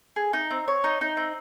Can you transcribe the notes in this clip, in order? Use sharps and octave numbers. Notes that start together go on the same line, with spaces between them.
G#4
D#4
C4
C#5
D#4
D#4
C4